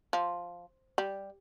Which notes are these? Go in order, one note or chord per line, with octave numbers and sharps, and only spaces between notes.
F3
G3